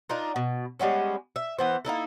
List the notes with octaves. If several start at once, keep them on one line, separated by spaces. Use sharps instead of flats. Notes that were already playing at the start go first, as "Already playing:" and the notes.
D4 D#4 F4 A#4
B2
G3 G#3 B3 C#4
E5
E3 B3 C5
A#3 D#4 E4 A4